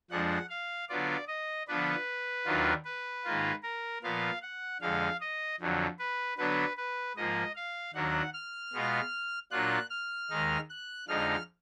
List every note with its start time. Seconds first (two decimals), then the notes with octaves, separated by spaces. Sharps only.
0.10 F2 F3 G#3 D4 F#5
0.49 F5
0.89 D3 F#3 B3 F4 D5
1.28 D#5
1.68 D3 F3 B3 D4 B4
2.46 D#2 D#3 F#3 D4 F4
2.84 B4
3.25 G#2 D#3 A#3 F4
3.63 A#4
4.03 A#2 F3 B3 F5
4.42 F#5
4.81 F2 D3 G#3 F5
5.21 D#5
5.60 F2 D3 F#3
5.99 B4
6.37 D3 F#3 B3 D4 B4
6.77 B4
7.16 G#2 F3 A#3 D#5
7.56 F5
7.94 D#2 D#3 F#3 D4 F#5
8.34 F6
8.73 B2 G#3 B3 F4
9.51 A#2 F#3 D4 F4 F#6
9.90 F6
10.30 D#2 D#3 G#3 D#4
10.70 F#6
11.08 F2 D3 F3 G#3 D#4 F6